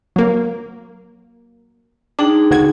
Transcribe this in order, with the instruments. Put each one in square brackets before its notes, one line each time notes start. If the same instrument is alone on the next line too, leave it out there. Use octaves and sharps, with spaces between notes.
[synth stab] F#3 A#3
[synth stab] D4 [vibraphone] D#4 G#4 G5
[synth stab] D2 F#4 G#6